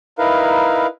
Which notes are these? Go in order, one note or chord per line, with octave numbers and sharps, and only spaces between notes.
D#4 E4 A#4 B4 F5